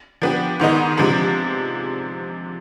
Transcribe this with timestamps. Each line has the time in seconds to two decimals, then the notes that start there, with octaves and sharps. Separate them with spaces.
0.22 F3 B3 D4 G4
0.60 G#2 D#3 B3 D#4
0.97 C3 F3 G#3 D4